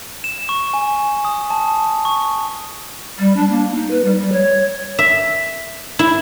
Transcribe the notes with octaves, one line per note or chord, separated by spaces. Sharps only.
E7
C#6
G#5
D#6
A5
C#6
G3
D4
A#3
D#4
B4
G3
G3
C#5
E5
E4